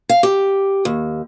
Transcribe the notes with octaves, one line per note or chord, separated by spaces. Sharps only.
F5
G4
D#2